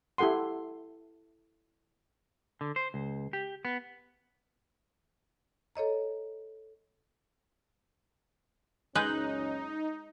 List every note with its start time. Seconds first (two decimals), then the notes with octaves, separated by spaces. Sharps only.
0.18 E4 G4 A4 F#5 C6
2.61 D3
2.76 C5
2.94 C#2
3.33 G4
3.65 B3
5.75 A4 C#5 D#5 A#5
8.95 F#1 C#2 G#3 C#4 D#4 B4 F#6 G6